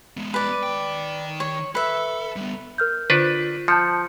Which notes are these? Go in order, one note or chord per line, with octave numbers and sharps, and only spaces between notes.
G#3 B3
B4 D5
D#3 G5
C#5
A4 B4 E5
G3 B3
A#4 F6 G6
D3 D4 F4 B4
F3 A5 G6 C#7